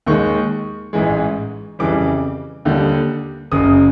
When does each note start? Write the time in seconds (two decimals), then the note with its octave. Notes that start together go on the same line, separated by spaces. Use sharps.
0.06 D#2 D#3 G#3 C#6
0.93 A1 G#2 E3 G#3
1.79 F2 C#3 E3 G3 D6
2.65 D#2 D3 G3
3.52 F#1 F#2 C#3 D#6